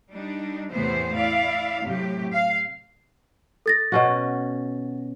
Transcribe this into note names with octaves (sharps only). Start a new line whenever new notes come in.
G3 D4 D#4
E2 A2 C3 E3 B3 C5
E4 D5 F5
A2 C3 F#3 G4
F5
A4 A6 A#6
B2 C#4 F#4